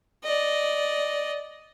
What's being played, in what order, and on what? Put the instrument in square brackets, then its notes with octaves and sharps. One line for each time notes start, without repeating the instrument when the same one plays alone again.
[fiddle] D5 D#5